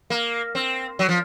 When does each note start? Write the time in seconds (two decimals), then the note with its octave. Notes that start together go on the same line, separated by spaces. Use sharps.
0.10 A#3
0.55 C4
0.99 F#3
1.09 F3